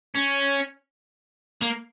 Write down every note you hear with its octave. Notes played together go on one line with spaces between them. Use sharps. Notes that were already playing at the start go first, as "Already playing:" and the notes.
C#4
A#3